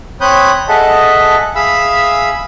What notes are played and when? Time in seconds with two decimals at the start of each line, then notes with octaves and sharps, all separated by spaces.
0.21 C4 C#5 B5 D#6 F#6 G6
0.69 G#4 A4 D#5 E5 F#5 A5
1.55 G#4 E5 F5 B5 E6